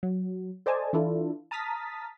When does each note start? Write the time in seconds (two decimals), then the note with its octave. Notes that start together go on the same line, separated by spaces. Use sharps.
0.03 F#3
0.66 A4 C5 D5 D#5 G#5 A5
0.93 E3 D4 E4 F4 A4
1.51 A5 A#5 D#6 F6 A6 B6